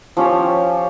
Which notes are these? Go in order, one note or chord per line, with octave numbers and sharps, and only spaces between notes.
F3 C#4 G4 C#5